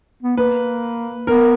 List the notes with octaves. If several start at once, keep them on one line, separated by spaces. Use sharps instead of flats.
B3
A#3 B4
B3 A#4